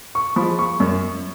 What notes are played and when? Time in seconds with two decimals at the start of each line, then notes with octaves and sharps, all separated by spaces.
0.15 C#6
0.36 F3 B5
0.41 G#3
0.59 C#6
0.80 F#2